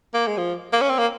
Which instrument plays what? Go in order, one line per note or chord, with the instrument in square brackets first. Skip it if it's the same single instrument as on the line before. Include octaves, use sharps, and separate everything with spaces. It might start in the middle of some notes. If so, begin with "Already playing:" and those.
[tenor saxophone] A#3
G#3
F3
A#3
C#4
C4
A#3